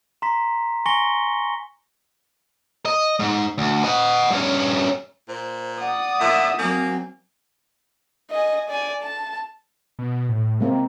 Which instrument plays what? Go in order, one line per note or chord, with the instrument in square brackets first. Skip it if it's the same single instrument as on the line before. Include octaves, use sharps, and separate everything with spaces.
[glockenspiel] A#5 C6 B6
G#5 C6 C#6 A#6 C#7 G7
[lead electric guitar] D#5
G#2
D2
D#5 F#5
G2 C#4
[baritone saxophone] A#2 [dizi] C5
[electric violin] D5 D#6 [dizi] F#5
[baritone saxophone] A#2 [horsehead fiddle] E5
[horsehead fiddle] F#3 C4 [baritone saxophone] A#3 [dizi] G#5
[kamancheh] D#5 G#5
D5 G#5
A5
[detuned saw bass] B2
A2
[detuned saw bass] C3 [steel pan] G#3 A#3 C4